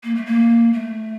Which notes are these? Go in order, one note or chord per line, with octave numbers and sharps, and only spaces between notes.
A#3
A3
A#3
A3